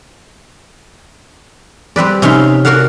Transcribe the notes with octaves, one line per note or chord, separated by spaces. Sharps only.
G3 C4 B4 D5
C3 C#4 D#4 F5 B5 C6
F#4 A#4 D5 F5 F#5